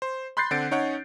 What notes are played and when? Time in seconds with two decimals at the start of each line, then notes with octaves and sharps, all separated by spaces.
0.02 C5
0.37 B5 C6 F#6 G6 A6 C7
0.51 D3 C4 F#5 A6 D7
0.71 C#4 D#4 C#5 F#5